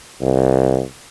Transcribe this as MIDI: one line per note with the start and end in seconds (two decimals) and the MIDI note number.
0.21 0.81 36